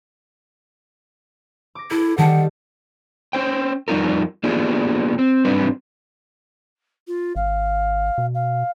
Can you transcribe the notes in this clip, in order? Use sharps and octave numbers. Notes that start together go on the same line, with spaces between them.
D6 A#6
E4 A4
D#3 G3 F#5 A5
C#4 C5 G5
F2 G3 D#4 F4 A#4
A#3 B3 D4 F4 G4 G#4
C4
G#2 G3 C4 D4 B4
F4
G#1 F5
B2
F5